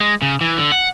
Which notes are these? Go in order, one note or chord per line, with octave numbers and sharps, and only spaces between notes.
G#3
C#3
E3
D3
F#5